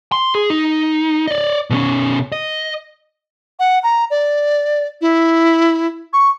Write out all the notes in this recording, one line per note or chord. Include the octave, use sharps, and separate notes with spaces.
C6
G#4
D#4
D5 D#5
B2 C#4
D#5
F#5
A#5
D5
E4
C#6